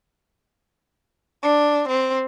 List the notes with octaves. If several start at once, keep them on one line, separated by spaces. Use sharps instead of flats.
D4
C4